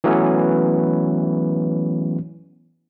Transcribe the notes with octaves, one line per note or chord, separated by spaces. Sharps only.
E3 F#3 A3 B3 C#4